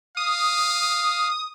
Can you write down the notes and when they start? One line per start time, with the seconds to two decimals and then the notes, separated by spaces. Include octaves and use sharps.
0.17 F5 D#6